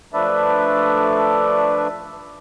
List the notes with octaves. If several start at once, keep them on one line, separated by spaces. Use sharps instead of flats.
F3 A3 D4 B4 D5 E5